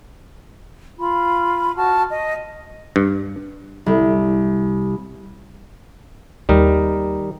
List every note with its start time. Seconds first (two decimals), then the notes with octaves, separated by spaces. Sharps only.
0.99 F4 B5
1.76 F#4 A5 F6
2.09 D#5
2.96 G2
3.86 C2
6.49 D#2 G3 D#4 A#4